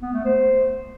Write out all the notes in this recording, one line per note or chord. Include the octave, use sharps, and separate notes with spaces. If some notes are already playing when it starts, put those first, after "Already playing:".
B3
A3
C5